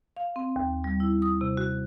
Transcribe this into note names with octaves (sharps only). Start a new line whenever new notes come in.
F5
C4
D#2
G3
E4
D#6
C3
F#4